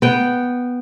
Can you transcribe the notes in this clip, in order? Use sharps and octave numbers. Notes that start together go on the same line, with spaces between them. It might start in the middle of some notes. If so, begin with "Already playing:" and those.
B3 G5